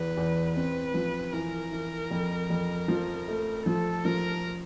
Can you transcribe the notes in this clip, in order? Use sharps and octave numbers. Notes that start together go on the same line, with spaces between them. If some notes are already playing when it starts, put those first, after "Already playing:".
Already playing: E2 B4
E2
C4 B4
F3
E3 A#4
E3
F2
F2
F3
A3
F3 A4
F3 A#4